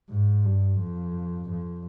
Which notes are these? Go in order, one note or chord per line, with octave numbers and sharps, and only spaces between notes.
G#2
G2
F2
F2